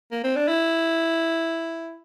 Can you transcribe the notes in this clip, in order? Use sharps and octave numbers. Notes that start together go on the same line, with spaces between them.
A#3
C4
D4
E4